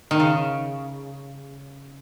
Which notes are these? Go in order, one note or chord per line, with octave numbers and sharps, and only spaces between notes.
D#3
C#3